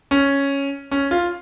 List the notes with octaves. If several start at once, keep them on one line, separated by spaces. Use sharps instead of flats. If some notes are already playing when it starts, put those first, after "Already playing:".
C#4
C#4
F4